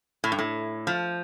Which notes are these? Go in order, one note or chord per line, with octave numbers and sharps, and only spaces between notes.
A2
G2
A2
F3